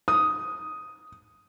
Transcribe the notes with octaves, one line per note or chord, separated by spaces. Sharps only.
D#6